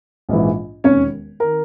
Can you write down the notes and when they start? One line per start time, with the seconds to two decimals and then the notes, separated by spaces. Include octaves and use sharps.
0.29 A#1 G#2 E3
0.84 E1 D#2 D#3 C#4 C#5
1.40 D#3 A#4